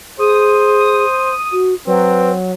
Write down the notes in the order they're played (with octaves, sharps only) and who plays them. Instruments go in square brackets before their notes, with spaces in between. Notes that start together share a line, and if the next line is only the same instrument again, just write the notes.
[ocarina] G#4 [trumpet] C5 [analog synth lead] D#6
[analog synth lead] D#6
[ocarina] F#4
[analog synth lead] F#3 [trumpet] C4 [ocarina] B4